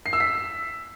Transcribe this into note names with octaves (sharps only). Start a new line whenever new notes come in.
C7
E6
B6